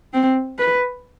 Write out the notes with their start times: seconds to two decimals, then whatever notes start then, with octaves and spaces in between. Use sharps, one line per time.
0.14 C4
0.59 B4